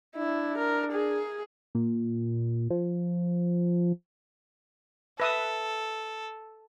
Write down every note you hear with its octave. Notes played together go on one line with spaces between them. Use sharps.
D4 E4
A#4
G#4
A#2
F3
A4 B4 E5 D#6